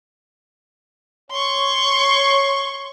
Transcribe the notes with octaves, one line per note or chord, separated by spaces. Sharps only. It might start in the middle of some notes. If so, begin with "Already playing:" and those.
C#5 C6 C#6